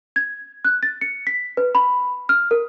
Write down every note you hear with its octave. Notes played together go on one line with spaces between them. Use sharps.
G#6
F#6
A6
C#7
B6
B4
B5
F6
A#4